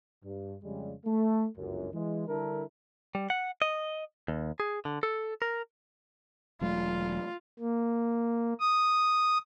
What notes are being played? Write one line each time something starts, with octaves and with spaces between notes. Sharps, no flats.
G2
F2 C#3 G3 G#3
A3
G1 C#2 F#2
E3 G#3
D3 G3 D4 E4 A4 A#4
G3
F#5
D#5
D#2
G#4
D3
A4
A#4
E1 F#3 A3 F4
A#3
D#6